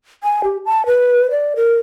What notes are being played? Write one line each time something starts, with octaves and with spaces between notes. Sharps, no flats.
G#5
G4
A5
B4
D5
A#4